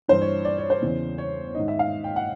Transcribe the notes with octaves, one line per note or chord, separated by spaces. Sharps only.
G2 E3 C5
C#5
D5
C#5
C5
E2 C#3 E3
C#5
G#2 D#3 D#5
E5
F5
G5
F#5